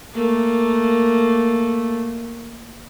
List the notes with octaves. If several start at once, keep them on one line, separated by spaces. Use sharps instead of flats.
A3 A#3